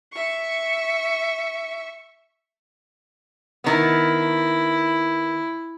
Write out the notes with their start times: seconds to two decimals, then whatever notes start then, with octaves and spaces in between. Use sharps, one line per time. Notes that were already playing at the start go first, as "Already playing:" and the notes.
0.12 E5 C#6
3.64 D#3 B3 E4